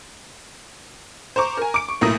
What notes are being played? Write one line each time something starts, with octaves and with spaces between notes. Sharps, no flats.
C5 A#5 C#6 D6
A#4 G#5
D6 D7
C#6
B1 A2 A#3 E4 D#6 A#6